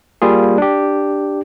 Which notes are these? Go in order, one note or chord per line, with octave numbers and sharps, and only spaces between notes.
G3 A#3 F4 G#4
D4 G4